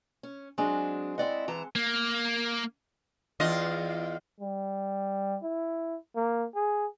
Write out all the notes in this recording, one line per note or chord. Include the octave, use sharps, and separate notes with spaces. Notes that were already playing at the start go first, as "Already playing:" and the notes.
C#4
F#3 G#3 C4 D4
C4 E4 D5 D#5 F#5
E3 A5 A#5
A#3
E2 F4 D#5
G3
E4
A#3
G#4